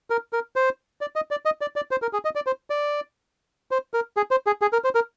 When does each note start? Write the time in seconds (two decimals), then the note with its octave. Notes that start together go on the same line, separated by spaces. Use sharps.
0.10 A#4
0.33 A#4
0.56 C5
1.01 D5
1.16 D#5
1.31 D5
1.45 D#5
1.61 D5
1.76 D5
1.91 C5
2.02 A#4
2.13 G#4
2.25 D#5
2.35 D5
2.47 C5
2.70 D5
3.71 C5
3.94 A#4
4.17 G#4
4.31 C5
4.47 G#4
4.62 G#4
4.73 A#4
4.84 C5
4.95 A#4